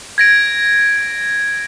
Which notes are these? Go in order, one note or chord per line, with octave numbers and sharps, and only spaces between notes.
G#6 A#6 D7